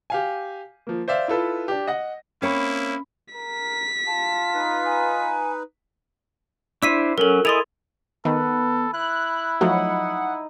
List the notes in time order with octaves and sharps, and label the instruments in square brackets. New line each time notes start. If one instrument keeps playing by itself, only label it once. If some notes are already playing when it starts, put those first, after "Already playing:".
[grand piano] G4 F5 G#5
F3 A#3
C5 D5 E5 F5
E4 F4 A4 B4
D4 G4
D#5 F#5 A#6
[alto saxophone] A#3 [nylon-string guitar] C4 C#5 [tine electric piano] C#4 B5 [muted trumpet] E4
[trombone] A#4 [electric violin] B6
[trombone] F4 [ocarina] A5
[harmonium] D#4 B4
[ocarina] G#5
[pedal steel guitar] D4 E4 C5 [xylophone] E6 B6 D#7
[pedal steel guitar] F#3 C#4 [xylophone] A4 A#4
[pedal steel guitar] E4 G#4 D#5 [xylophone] C6 A6 F7
[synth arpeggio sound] D#3 [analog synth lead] B3 [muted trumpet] A4 [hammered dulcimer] B4
[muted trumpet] E4 [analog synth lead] F#6
[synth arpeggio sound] F3 F#3 A3 [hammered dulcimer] D#4 D#5 [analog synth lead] F#5